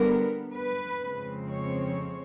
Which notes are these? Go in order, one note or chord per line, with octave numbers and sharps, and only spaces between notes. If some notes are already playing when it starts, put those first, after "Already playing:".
Already playing: D3 G3 B3 A#4
B4
F2 C#3 F3 G#3 C4
C#5